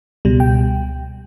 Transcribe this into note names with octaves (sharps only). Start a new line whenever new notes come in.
C#2 B2 G3
G5